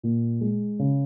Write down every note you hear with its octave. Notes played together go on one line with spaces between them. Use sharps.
A#2
G#3
C#3